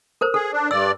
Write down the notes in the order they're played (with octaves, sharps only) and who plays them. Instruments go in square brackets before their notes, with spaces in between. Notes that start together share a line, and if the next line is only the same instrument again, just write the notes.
[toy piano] A4 A#4 C5
[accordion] G#4 [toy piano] A4
[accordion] D4
[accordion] G2 D5 [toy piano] E6